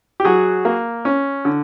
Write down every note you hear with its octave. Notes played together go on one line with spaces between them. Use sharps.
G4
F#3 F#4 G#4
A#3
C#4
D3